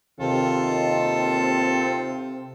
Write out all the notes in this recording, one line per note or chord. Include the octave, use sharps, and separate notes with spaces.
D#2 C3 D#3 C4 F4 A4